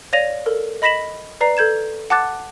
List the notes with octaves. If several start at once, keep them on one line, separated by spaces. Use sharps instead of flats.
C#5 D5 F5 A#6 D#7 F7
A4 A#4
D#5 B5 A#6 B6 E7 F#7
B4 D5 A#5 C7
A4 G6 G#6 E7
F#5 A5 D6 F#6 A6